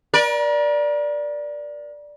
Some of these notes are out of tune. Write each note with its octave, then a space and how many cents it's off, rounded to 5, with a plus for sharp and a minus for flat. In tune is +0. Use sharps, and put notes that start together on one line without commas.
A#4 +40 D5 +0